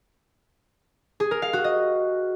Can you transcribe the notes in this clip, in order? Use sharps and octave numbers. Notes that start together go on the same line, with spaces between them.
G#4
A#4
F5
F#4
D#5